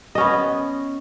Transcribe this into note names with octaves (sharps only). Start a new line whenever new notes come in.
B3 C#4 D#5